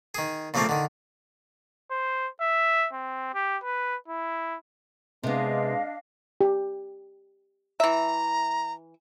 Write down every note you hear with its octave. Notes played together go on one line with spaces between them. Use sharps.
D#3 G#4
A#2 C#3 F3 A3 A#3 C4
D3 D#3
C5
E5
C4
G4
B4
E4
C3 G#3 B3 D4 D#5 F5
G4
E3 E5 A#5